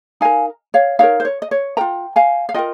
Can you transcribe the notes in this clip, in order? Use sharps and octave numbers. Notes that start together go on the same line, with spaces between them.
D#4 A#4 F5 G#5
C#5 F5
D#4 A#4 C#5 F5
C5
C#5
D#5
C#5
F4 A#4 G5 A#5
F5 G#5
F5
F4 A#4 D#5 G5